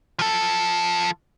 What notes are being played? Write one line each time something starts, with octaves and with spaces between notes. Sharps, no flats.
F3 A4